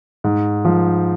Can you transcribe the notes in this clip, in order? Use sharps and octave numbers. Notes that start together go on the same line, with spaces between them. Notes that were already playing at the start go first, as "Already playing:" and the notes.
G#2
F3